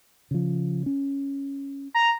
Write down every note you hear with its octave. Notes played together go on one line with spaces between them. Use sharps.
C#3 F3
C#4
A#5